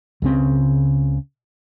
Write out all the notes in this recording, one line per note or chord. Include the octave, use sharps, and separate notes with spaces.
C#2 C#3 C4